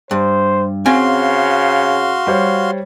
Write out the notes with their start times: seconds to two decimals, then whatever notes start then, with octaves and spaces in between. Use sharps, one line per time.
0.11 G2 C5
0.86 C#3 C4 F#4 F5 G#5 C6
2.27 G3 C5 C#5